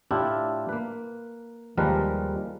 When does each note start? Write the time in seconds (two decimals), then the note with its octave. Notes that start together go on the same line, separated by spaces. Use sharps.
0.11 A2 D4 E4 F4 G4 A4
0.69 A#3 B4
1.77 D#2 F3 G3 G#3 A#4 B4